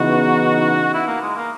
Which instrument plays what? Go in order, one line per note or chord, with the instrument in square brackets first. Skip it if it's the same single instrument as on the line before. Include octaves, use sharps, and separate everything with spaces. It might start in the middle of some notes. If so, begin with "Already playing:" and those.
Already playing: [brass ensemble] C#3 E3 B3 D#4 [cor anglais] F#4
[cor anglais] E4
A#3
G#3
A#3